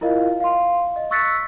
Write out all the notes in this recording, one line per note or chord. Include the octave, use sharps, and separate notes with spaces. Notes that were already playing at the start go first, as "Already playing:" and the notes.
E4 F4 A#4 D#5 F5
F5 C6
D#5
C#6 E6 F#6 A6 B6 C#7